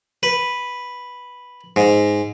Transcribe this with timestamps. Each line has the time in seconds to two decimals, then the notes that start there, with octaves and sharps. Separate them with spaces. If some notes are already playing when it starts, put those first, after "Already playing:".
0.23 B4
1.76 G#2